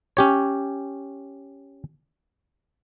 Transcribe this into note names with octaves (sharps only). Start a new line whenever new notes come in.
C#4 G4 C#5